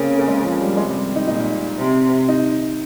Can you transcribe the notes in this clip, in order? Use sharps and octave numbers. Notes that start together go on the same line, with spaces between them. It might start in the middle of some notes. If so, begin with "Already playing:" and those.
Already playing: C#3 A#3 C4
A#3
G#3
F3
G3
C3 G#3
G3
D#4
A#2 D#4
C3
D#4